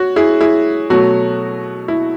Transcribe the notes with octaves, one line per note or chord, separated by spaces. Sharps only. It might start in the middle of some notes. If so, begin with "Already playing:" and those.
Already playing: F#4 C#5
E4 G#4
E4 G#4
B2 F#3 A3 F#4
E4